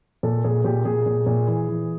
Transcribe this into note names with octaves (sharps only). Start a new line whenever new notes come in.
A#2 A4
A#2 G#4
A#2 G4
A#2 G#4
A#2
A#2
E3
E3